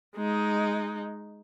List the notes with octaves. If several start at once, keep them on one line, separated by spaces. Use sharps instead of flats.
G#3 D#4